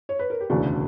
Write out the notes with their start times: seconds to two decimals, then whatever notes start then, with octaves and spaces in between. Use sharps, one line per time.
0.09 C#5
0.19 B4
0.30 A#4
0.40 G4
0.50 E1 D2 C#3 E3 D4 F#4